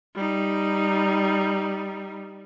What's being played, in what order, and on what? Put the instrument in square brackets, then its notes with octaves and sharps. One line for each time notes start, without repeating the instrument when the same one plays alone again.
[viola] G3 D#4